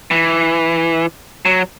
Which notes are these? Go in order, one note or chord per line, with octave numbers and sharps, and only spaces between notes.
E3
F#3